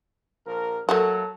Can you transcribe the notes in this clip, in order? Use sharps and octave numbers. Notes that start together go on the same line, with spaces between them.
A#1 F3 A#4
F#3 A3 A#3 F#4 A4